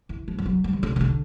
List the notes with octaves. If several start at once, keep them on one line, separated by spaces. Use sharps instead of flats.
E3
F3
G3
F#3
G3
D#3
D3
D#3
D3